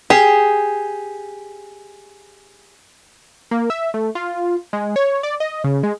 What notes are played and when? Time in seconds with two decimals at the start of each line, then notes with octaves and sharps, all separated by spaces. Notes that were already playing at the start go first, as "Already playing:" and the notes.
0.10 G4 G#4
3.51 A#3
3.70 E5
3.94 A3
4.15 F4
4.73 G#3
4.96 C#5
5.23 D5
5.40 D#5
5.64 C#3
5.83 G#3